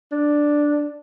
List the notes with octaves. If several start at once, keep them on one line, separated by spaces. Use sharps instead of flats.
D4